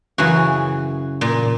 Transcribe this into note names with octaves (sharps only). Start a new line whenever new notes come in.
F#2 C#3 E3 F#4
A#2